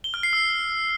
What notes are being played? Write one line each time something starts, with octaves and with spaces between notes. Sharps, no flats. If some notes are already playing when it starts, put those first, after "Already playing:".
G7
F6
C7
E6